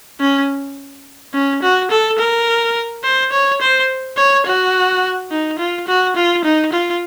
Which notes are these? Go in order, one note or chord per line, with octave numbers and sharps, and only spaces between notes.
C#4
C#4
F#4
A4
A#4
C5
C#5
C5
C#5
F#4
D#4
F4
F#4
F4
D#4
F4